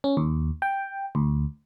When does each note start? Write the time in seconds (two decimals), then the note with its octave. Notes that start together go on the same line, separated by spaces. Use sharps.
0.04 C#4
0.17 D#2
0.62 G5
1.15 D2